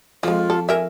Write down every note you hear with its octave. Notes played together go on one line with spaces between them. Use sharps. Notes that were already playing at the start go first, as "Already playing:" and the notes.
F2 F3 G#3 F4
A4
A#4 E5 G#5